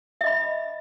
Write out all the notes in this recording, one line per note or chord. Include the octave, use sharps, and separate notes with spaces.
D#5 E5 B5